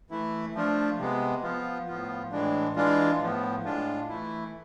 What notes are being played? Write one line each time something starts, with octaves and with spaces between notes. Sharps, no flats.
E3 A3 E4
F3 A3 D4 F4
C3 G#3 B3
F3 B3 F4
A2 F3 B3 F4
A2 E3 G#3 D4
E3 G#3 D4 F4
A2 F3 B3
A2 G#3 D4 F4
E3 A3 E4